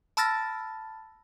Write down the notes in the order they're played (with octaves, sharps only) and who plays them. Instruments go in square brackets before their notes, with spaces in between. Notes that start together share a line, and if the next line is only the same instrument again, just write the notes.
[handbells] A5 B5 E6 F6 A6 A#6